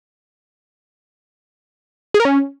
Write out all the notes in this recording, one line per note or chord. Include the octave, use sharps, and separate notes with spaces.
G#4
A#4
C#4